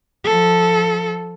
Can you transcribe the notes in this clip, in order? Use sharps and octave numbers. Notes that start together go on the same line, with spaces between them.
F3 A4